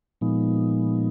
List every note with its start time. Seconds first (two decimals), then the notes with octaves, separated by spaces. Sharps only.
0.21 A#2 F3 G#3 B3 D#4